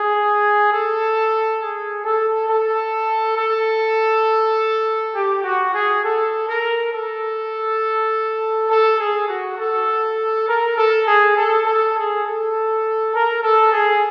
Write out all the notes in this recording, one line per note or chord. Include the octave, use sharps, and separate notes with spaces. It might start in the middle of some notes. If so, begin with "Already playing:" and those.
Already playing: G#4
A4
G#4
A4
A4
A4
G4
F#4
G#4
A4
A#4
A4
A4
G#4
F#4
A4
A#4
A4
G#4
A4
A4
G#4
A4
A#4
A4
G#4